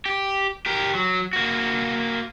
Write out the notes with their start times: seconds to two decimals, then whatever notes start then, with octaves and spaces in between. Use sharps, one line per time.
0.06 G4
0.66 G4 A#4
0.95 F#3
1.33 A#3 F#4